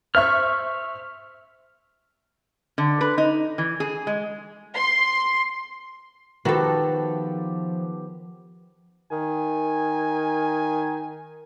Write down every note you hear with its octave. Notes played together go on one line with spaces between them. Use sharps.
C5 E5 C#6 F6
D3
B4
D#4
E3
G#4
G#3
C6
D#3 F3 B3 F#4 G4 A4
D#3 G#5